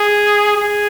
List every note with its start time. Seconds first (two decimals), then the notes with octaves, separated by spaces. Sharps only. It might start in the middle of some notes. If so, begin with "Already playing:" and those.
Already playing: G#4
0.57 G#4